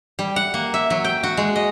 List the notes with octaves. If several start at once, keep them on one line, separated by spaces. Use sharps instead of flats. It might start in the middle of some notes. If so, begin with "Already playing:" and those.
G3
F#5
A#3
E5
F#3
G5
F#4
G#3
D#5